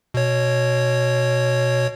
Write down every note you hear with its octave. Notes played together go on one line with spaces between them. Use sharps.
B2 C#5